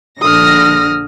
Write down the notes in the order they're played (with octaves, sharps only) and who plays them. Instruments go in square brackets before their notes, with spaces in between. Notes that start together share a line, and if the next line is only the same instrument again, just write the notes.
[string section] A#1 D3 A#6 [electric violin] D#6 F6